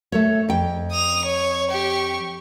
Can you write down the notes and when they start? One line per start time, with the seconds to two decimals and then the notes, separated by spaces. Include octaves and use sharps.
0.12 A3 A4 C#5
0.49 F2 G5
0.92 D#6 F7
1.25 C#5
1.71 G4 C#6